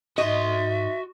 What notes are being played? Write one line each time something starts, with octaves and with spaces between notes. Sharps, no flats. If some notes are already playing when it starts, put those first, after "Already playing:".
G#2 F#4 D#5 E5 C6